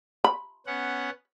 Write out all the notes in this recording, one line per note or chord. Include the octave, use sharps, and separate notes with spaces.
B5
B3 C#4 F#5